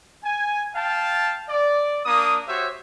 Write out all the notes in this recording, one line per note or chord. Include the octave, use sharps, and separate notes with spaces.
G#5
F5 G5 A5
D5
A#3 D4 D#6
F#4 G4 C5 C#5 E5